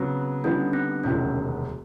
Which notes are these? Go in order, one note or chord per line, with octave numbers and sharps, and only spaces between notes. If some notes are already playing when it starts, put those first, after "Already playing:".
Already playing: C#3 F#3 B3 C4
D3 G3 B3 C#4 D#4
C4
E1 D2 C3 D#3 F#3 C#4